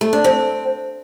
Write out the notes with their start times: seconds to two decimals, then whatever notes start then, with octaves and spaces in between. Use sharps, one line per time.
0.01 A3
0.13 D4
0.24 C4